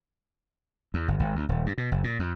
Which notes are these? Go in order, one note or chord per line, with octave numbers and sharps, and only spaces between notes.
E2
G1
G#1
D2
D#1
G2
B2
F#1
A#2
F2